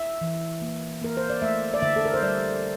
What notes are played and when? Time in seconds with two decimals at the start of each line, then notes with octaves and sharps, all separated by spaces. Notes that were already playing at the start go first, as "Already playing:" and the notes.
Already playing: E5
0.21 E3
0.62 A#3
1.01 A#3 A#4
1.17 C5
1.30 D5
1.42 A3 E5
1.74 D5
1.82 D3 E5
1.96 A4
2.05 A#4
2.14 C5
2.22 G3 D5